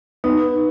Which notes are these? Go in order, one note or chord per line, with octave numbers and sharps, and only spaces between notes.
B3 D#4